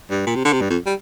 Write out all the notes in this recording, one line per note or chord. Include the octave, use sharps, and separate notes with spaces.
G2
A#2
C3
D3
C3
G2
F2
G3